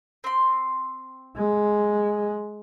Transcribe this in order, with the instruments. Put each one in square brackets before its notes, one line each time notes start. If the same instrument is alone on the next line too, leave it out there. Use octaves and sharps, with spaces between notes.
[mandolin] C4 C6
[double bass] G#3